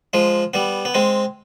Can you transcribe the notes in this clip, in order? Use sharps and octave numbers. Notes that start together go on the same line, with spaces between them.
F3 G#3
G3 B3
B3
G#3 C4